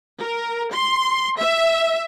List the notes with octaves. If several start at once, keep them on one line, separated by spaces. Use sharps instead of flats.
A#4
C6
E5